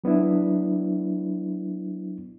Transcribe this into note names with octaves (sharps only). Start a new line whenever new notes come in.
F#3 B3 D4 E4